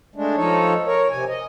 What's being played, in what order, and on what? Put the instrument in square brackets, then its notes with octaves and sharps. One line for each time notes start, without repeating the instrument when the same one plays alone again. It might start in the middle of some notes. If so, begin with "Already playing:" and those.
[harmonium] G#3 A3 D4
F3 D#4 A4 C#5
A#4 C#5
C3 G#5
D#5